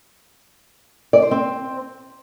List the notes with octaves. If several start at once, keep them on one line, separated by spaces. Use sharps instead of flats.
D5
C5
C4